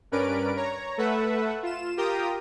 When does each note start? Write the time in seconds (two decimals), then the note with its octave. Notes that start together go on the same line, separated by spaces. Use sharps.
0.12 G2 C#4 A#4 B4 D5 D7
0.56 C#5 A#5
0.98 A3 A4 B4 E5 F#5
1.63 F4 E7
1.97 F4 G4 A#4 G5 A#5 D#6